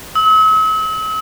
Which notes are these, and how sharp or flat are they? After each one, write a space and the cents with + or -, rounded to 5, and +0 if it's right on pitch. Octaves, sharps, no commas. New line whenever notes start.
E6 -45